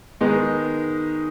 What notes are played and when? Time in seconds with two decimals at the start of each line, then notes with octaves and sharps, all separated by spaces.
0.21 D#3 G#3 B3 D#4